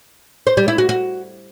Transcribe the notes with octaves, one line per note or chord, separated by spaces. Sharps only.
C5
G3
E4
F#4
F#4